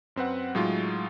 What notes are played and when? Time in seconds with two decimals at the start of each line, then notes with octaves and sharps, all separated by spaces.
0.16 F#2 C4 B4 F#5
0.55 A2 F#3 G#3 D#4 F4